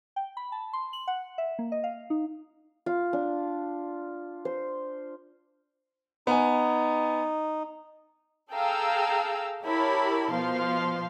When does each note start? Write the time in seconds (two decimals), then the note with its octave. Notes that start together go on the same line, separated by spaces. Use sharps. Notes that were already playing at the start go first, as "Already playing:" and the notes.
0.16 G5
0.37 B5
0.52 A5
0.73 C6
0.93 F#7
1.08 F#5
1.38 E5
1.59 A#3
1.72 D#5
1.84 F5
2.10 D#4
2.86 F4
3.13 D4
4.45 C5
6.27 B3 D#4 G#5
8.52 G#4 A4 F5 G5 A#5 E6
9.65 E4 G4 A#4 C#5 A5 B5
10.32 B2 F3 F5 C6